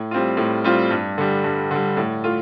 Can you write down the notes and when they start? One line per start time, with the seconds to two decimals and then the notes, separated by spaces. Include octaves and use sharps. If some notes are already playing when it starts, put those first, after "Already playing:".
Already playing: A2
0.11 G3 C4 F4
0.37 A2
0.64 G3 C4 F4
0.91 G2
1.18 D3 G3
1.44 G2
1.71 D3 G3
1.97 A2
2.24 A3 F4